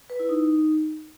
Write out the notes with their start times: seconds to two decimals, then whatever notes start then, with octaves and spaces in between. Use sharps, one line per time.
0.10 B4
0.19 E4
0.29 D#4